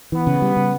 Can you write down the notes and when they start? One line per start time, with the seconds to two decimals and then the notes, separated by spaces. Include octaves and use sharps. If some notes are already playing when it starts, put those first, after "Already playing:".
0.12 E3 B3
0.27 C#3
0.42 G3
0.57 C#3